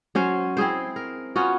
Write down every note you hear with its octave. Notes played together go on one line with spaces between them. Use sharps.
F#3 C#4 C5
C4 E4 G#4 C5
A#4
B3 C#4 F4 F#4